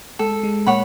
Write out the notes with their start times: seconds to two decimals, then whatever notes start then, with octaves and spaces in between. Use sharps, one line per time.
0.19 G#3 A4
0.43 G#3
0.66 A#2 A#3 C#5 F#5 B5